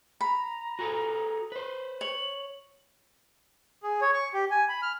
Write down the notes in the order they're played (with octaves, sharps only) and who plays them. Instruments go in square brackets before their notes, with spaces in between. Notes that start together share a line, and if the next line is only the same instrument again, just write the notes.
[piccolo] A#5 [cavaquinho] B5
[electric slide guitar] F#4 G#4 A4
B4 C5
[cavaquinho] C#5 [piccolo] F#7
[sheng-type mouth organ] G#4
C#5
C#6
G4
G#5
B5
F6